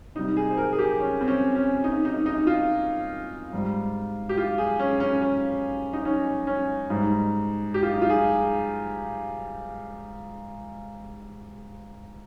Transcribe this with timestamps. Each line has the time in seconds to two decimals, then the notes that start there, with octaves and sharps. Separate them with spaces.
0.15 C3 G3 D#4
0.37 G#4
0.51 C5
0.57 A#4
0.73 G#4
0.79 G4
0.99 C#4
1.21 C4
1.28 C#4
1.55 C#4
1.84 D#4
2.05 D#4
2.26 D#4
2.47 F4
3.53 G#2 G3
4.29 G4
4.37 F4
4.58 G#4
4.79 C#4
5.00 C#4
5.22 C#4
5.93 D#4
6.05 C#4
6.47 C#4
6.90 G#2 G3 D#4
7.74 G4
7.83 F4
7.93 D#4
8.02 F4
8.09 G#4